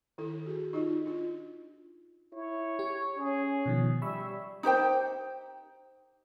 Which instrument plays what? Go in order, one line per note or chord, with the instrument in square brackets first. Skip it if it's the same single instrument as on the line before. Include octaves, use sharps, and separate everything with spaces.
[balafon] D#3 E4 A4
F#4 G#4
D#4 F4 D#5
D4 F4
[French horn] E4 [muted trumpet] C#5
[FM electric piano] G4
[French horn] C#4 [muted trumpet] G#4
[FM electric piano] B2 D#3 F3
[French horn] G3 [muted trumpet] E5 [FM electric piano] B5 C#6 E6
[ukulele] D#4 G4 C5 G5